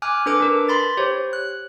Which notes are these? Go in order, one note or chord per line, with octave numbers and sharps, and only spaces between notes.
G#5 D6 F6 F#6
D4 A4 B4 D6 D7
D4 A#4 B4
B5 C6 A6
G4 C5 C#5
F#6